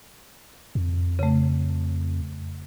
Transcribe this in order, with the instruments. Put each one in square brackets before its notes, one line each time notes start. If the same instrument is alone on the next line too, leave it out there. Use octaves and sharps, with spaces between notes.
[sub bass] F2
[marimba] C#3 A3